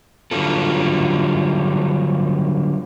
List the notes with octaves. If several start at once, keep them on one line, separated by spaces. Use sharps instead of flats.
D3 F#3 G3 F4 A4